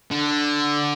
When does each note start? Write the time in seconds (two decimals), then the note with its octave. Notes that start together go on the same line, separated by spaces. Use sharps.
0.11 D3